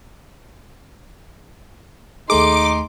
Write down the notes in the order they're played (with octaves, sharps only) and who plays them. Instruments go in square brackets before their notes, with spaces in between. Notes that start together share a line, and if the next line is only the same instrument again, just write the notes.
[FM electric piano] D#2 A3 G#4 [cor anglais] D#4 [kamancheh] C6 [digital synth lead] D6